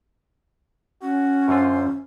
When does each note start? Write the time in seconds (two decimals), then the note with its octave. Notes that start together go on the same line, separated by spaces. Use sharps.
1.02 C#4 F#4
1.48 F#2 D3 F4 C5